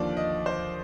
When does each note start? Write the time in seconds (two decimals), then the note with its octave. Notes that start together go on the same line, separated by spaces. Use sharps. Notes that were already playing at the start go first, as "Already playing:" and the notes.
Already playing: D#2 D3 F3 D5
0.17 D#5
0.46 C5